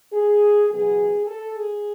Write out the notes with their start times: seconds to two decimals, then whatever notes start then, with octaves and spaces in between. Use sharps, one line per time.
0.13 G#4
0.70 F#1 E2 B2 F#3 B3 G#4
1.26 A4
1.54 G#4